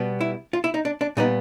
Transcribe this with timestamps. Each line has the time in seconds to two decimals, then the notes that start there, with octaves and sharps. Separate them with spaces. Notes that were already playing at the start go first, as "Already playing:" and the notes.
Already playing: B2 G3 B3
0.21 E4
0.53 F4
0.64 E4
0.74 D#4
0.85 D4
1.01 D4
1.17 A#2 G3 B3 D#4